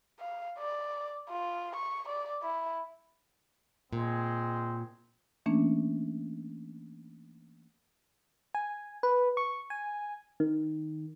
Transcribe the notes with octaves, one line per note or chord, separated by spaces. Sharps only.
F5
D5
F4
C#6
D5
E4
A#2 G#3 C4
E3 A3 A#3 C#4 D4
G#5
B4
C#6
G#5
D#3